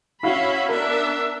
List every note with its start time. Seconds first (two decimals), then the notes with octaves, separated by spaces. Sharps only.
0.23 C#4 E4 F#4 E5 F5 B5
0.69 B3 D4 A#4 E5